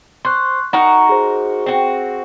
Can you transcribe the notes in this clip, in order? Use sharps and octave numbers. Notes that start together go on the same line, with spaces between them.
C5 C6 C#6 F#6
D#4 F#4 A#4 F#5 C#6
G#4 C5
C4 F#4